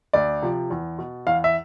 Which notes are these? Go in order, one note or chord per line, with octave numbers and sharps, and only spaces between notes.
D2 D5
C3 F3
E2
B2
E2 F5
E5